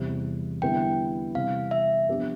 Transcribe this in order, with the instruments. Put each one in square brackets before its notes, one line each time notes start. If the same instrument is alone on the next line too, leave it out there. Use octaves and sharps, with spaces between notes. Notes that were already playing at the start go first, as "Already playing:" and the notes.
Already playing: [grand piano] E2 C3 G3
[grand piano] D3 G3 B3 E4 [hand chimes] G5
[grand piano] C3 E3 G3 C4 G4 [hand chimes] F5
[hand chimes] E5
[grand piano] F3 B3 D4 G4